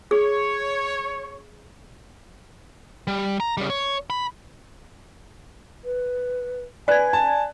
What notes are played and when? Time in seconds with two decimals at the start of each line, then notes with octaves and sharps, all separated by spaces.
0.11 G#4 C#5
3.07 G3
3.40 A#5
3.57 C#3 G3
3.70 C#5
4.10 B5
5.84 B4
6.88 B4 D5 G#5 F#6 G#6
7.13 A5